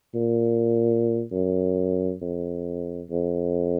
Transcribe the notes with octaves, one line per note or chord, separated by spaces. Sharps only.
A#2
F#2
F2
F2